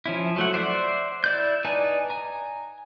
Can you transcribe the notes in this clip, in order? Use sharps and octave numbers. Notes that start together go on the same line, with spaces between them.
F3 C#4 E4
F#3 A3 F#5
C5 D5 E5 F#5
E4 D5 G6
D#4 B4 D5 G#5 A5
G#5 A#5